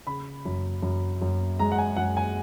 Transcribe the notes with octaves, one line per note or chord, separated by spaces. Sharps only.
C#3 B5
F#2
F#2
F#2
G#3 A#5
F#5
G#5
F#2 F#5
G#5